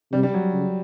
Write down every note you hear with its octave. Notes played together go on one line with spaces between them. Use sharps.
C3 G3
G3
F#3
C#3